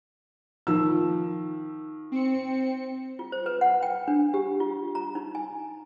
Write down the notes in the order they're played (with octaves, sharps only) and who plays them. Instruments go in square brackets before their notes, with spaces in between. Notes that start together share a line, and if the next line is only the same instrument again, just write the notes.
[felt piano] D#3 F3 E6
[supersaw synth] C4 C#7
[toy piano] F4
C5
B4
F#5
G5
D4
G4
F4
A#5
D#4
G#5